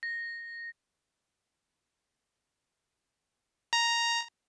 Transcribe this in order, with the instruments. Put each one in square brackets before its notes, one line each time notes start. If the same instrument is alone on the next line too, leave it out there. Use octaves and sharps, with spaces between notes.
[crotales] A#6
[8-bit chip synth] A#5